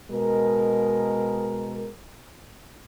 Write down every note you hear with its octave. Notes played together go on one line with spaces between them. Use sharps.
B2 G#3 A#4